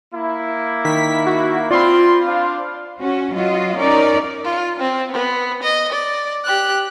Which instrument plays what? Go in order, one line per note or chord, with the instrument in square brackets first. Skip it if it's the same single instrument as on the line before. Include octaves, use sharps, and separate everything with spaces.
[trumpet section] A#3 E4
[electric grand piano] D#3 [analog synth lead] B6
[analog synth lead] F#4
[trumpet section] C4 C6 [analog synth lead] F4 [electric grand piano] D5 B5
[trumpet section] D4 C5 F5
[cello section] C#4 F#4
F#3 F4 F#4 D#5
C#4 D#4 A#4 D5
[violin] F4
C4
B3
D#5
D5
G4 F#6